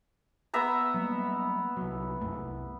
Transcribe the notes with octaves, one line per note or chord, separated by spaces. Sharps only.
B3 E5 A#5
F#3 G3 A#3
C2 F#3
E1 F#2 A3
C2